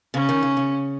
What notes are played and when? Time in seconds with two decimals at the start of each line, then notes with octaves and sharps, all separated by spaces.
0.14 C#3 C#4
0.29 D#3
0.43 C#3
0.57 C#3